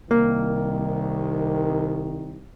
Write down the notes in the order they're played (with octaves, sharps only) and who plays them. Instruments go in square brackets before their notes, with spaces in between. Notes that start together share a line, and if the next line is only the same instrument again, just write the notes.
[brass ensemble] C2 D#3 [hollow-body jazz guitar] A#3